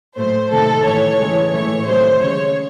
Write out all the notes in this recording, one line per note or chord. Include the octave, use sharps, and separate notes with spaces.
A2 F#3 A3 C5
C3 D#3 A3 A4
A2 E3 A3 C#5
C#3 E3 G#3
A2 E3 A3 C#5
C3 D#3 F#3 A3 C5
C#3 G#3 C#5